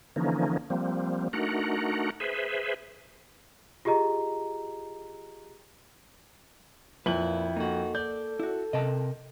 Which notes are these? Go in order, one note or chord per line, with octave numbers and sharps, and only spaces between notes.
D3 E3 F3 A#3 C#4 D#4
F3 G3 A#3 C4
A3 D4 D#4 F#4 A#4 F#5
G#4 B4 C5 E5
F4 G4 G#4 D#5 A#5
F2 A#2 E4 B4 F#7
A#3 D#4 F#4 A4
D5 G6
E4 F#4
C3 A#4 D#5 A5